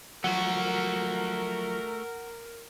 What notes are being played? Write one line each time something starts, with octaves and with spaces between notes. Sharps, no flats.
F3 F#3 A3 F#4 A#4 F#5